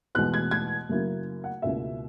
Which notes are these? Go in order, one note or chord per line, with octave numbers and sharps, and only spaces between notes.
E2 B2 G#3 B3 F#6
G#6
G#6
F#2 C#3 F#3 A#3 E4
F#5
C#2 B2 A#3 C#4 E4 E5